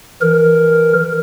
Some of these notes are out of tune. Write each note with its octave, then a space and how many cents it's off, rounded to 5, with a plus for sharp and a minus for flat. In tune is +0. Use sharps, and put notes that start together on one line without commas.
E3 +0 A#4 +0